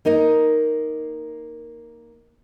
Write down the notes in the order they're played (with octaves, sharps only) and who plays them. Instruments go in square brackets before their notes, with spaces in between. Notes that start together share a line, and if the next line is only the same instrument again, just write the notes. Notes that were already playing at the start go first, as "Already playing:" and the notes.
[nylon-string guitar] A#3 D#4 A#4 D#5